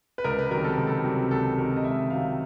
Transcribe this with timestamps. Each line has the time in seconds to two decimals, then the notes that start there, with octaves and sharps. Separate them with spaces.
0.18 B4
0.24 C#2 A#4
0.39 B4
0.51 C3 D#3 F#3 A#4
0.64 A4
0.77 C#2
0.87 A4
1.04 C3 D#3 F#3
1.31 C#2 A4
1.57 C3 D#3 F#3 A#4
1.77 D#5
1.84 C#2 E5
2.10 C3 D#3 F#3 F5